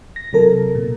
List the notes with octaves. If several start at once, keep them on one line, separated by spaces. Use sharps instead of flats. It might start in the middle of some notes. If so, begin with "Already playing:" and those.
A#6
C3 F#3 A4 A#4
A#2